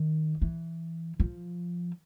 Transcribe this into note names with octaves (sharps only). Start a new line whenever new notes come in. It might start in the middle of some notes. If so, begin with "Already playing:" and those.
Already playing: D#3
E3
F3